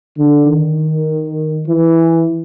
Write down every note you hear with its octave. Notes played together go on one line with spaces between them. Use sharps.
D3
D#3
E3